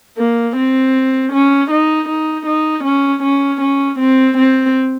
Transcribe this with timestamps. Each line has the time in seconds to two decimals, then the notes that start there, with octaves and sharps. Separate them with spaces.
0.18 A#3
0.56 C4
1.32 C#4
1.70 D#4
2.09 D#4
2.46 D#4
2.84 C#4
3.23 C#4
3.61 C#4
3.99 C4
4.37 C4